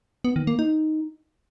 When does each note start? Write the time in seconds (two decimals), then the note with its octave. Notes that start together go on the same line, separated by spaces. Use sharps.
0.25 B3
0.36 D#3
0.47 A#3
0.59 D#4